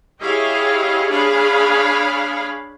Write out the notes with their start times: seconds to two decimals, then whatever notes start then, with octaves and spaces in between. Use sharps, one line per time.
0.22 E4 G4 G#4 C#5 D#5 F5
1.09 D4 G#4 C#5 F5 B5